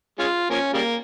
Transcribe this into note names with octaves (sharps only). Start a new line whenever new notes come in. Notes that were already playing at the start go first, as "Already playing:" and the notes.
G#3 C#4 F4
F3 A#3 C#4
C#3 G3 A#3